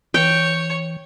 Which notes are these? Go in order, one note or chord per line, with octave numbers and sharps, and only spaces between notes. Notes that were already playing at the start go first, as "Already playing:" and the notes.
E3 C#5 G5